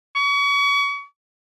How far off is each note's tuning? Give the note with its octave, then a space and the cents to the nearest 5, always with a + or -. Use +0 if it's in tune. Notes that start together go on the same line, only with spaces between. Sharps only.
C#6 +35